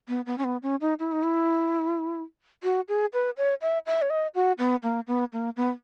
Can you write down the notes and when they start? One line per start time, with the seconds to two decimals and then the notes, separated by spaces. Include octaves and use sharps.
0.08 B3
0.26 B3
0.38 C#4
0.44 B3
0.63 C#4
0.81 D#4
0.99 E4
1.12 D#4
1.23 E4
2.64 F#4
2.89 G#4
3.13 B4
3.37 C#5
3.62 E5
3.86 E5
4.02 C#5
4.10 D#5
4.35 F#4
4.59 B3
4.83 A#3
5.07 B3
5.33 A#3
5.57 B3